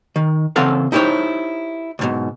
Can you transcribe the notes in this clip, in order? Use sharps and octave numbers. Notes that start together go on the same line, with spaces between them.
D#3
C#3 E3 C4 A4 F5 F#5
D#4 E4 G4 C5 C#5
C#2 G#2 B2